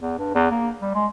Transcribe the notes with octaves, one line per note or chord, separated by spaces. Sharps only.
E2
G2
E2
A#3
G3
G#3